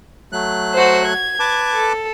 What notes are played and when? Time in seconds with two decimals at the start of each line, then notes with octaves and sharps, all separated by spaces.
0.32 F#3 A3 F#6
0.74 F#4 C5
1.06 G#6
1.40 B4 A5 D6
1.74 A4